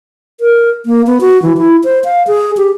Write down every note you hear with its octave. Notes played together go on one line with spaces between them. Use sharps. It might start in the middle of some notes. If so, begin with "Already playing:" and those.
A#4
A#3
B3
F#4
E3
E4
C5
F5
G#4
G4